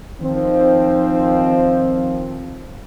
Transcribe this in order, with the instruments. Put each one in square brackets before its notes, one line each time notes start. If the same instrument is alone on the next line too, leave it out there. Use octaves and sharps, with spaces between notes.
[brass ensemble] D#3 F3 C4